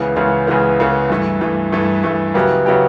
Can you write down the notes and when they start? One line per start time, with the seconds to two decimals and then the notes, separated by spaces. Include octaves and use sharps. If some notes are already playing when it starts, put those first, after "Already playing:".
Already playing: C#2 C#3 E3 B3
0.16 C#2 C#3 E3 B3
0.47 C#2 C#3 E3 B3
0.79 C#2 C#3 E3 B3
1.10 G2 E3 A3
1.41 G2 E3 A3
1.72 G2 E3 A3
2.04 G2 E3 A3
2.34 C#3 F#3 B3 E4 G4
2.66 C#3 F#3 B3 E4 G4